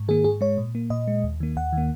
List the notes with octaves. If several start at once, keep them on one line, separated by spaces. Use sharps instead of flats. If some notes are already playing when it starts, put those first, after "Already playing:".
Already playing: G#2
D#3 A#3 G#4
G#2 G#4
G#3 C#5
A#2
A#3
A#2 D#5
G#3
D#2
D#3 A#3
D#2 F#5
D#3 A#3